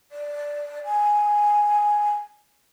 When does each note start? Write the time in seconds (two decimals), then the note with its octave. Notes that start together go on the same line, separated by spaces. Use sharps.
0.12 D5
0.85 G#5